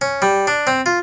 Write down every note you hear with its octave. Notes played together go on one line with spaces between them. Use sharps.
C#4
G3
D4
C4
F4